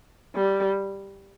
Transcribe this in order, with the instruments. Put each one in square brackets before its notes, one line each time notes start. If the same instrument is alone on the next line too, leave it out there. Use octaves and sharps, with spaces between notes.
[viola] G3